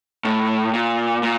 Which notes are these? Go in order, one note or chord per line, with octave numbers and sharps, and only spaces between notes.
A2
A#2
A#2